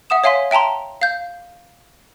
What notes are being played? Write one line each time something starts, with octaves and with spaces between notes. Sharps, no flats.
E5 F#5 D#6 E7
C#5 E5 F5 G#5 C6 B6
E5 G5 A5 A#5 C6
F5 G6